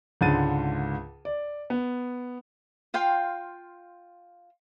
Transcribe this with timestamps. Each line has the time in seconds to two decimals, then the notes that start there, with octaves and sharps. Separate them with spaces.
0.21 C#2 G#2 D3 A6 D#7
1.25 D5
1.70 B3
2.94 F4 F5 G5 C6